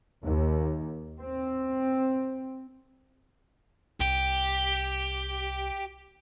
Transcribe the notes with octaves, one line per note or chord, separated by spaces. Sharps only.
D#2
C4
C2 G4